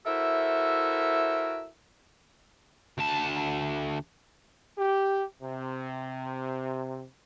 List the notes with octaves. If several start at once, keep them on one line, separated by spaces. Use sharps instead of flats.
E4 F#4 A4 A#4 C5 E5
D2 A5
G4
C3